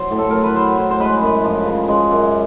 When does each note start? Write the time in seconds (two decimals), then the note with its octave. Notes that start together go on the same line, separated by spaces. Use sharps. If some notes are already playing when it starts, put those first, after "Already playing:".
Already playing: F#3 C5
0.11 A2
0.19 A4
0.31 F#3 A#4
0.43 B4
0.56 F#3 C5
0.77 A2 C5
0.91 C5
1.00 G#3 B4
1.21 F#2
1.44 F3
1.66 C#3
1.89 G#3
2.11 F#2